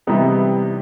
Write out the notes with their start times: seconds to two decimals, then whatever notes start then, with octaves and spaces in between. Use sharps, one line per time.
0.07 C3 E3 G3 B3 D#4